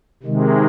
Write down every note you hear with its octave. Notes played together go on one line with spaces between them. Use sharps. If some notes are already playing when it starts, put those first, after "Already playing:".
C3 D#3 G#3